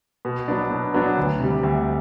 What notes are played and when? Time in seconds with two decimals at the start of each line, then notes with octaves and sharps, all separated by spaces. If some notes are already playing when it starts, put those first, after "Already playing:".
0.25 B2
0.48 F#3 B3 D4
0.71 B2
0.94 F#3 B3 D4
1.17 D2
1.40 C3 G3
1.63 D2